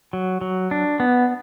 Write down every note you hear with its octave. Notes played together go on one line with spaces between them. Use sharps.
F#3
F#3
D4
B3